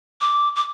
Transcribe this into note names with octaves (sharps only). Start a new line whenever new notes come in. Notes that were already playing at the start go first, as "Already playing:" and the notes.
D6
D6